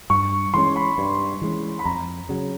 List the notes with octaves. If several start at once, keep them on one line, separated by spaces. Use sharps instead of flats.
G2 C#6
E3 G#3 C#4 C6
B5
G2
E3 G#3 C#4
B5
F2 A#5
C#3 F#3